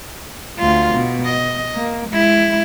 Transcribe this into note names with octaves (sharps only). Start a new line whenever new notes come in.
D2 F4
B2
D#5
A#3
G#3 E4